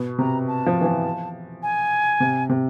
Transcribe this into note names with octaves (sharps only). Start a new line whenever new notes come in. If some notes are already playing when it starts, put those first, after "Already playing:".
Already playing: B2
C3 A#5
A5
F3
E3
F3
G#5
C3
C3